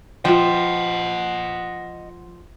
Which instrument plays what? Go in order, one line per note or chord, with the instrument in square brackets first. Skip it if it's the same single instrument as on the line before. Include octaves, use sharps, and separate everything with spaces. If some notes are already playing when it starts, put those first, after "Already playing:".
[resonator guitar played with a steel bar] F3 [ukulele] F4 G5 [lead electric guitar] D#5 F#5